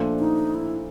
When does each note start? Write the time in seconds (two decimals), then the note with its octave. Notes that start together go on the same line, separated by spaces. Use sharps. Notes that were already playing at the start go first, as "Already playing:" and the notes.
Already playing: A#2 F3 A3 D4 F4
0.19 D#4
0.55 E4